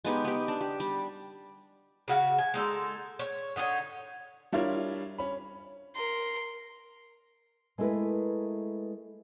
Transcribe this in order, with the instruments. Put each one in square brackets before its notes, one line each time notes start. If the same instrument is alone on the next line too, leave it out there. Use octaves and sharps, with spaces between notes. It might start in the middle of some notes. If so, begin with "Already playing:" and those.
[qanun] G#3 B3 D#4 G4
B3 G4
D4
G4
G3
[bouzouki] C#3 F#4 F5
G#5
G#3 D#4 A4
C#5
D3 D#4 F4 C#5
[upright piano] G3 D4 E4 F4 A#4 C#5
C#4 B5
[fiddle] A#4 C6
[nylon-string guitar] G#3 A3 B3 E4 A#4 B4